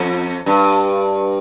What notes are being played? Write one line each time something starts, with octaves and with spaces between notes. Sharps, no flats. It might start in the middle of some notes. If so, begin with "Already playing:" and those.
Already playing: F2
G2